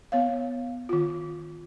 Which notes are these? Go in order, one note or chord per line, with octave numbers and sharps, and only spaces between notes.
B3 C#5 F5
D#3 F4